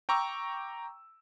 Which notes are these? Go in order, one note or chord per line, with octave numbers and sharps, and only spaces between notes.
G5 A#5 C#6 D6 E6